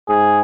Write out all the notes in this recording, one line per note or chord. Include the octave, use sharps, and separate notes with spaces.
G#2 G#4